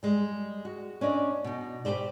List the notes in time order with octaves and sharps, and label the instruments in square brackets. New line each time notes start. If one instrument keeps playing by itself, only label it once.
[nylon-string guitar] G3 G#3
F#4
C#4 D4 D5 D#5
B2 D#4
G4 G#4 B4 C5 D5